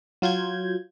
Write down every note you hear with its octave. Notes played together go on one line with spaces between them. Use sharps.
F#3 F4 G6 G#6